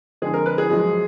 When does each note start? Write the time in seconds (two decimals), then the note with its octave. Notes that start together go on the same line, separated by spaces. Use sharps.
0.22 F2 D3 G#3 G#4
0.34 A#4
0.46 B4
0.58 G#4
0.70 F#2 F3 G#3